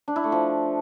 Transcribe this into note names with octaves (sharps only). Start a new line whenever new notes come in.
D4
E4
A3
F3